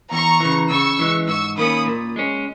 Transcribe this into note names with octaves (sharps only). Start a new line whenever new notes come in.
E2 A#5 C#6
C#3 E3
C#3 C#6 E6
E3 G#3
G#2 C#6 E6
D#3 A#3 C#4 B5 D#6
A#2
G#3 C#4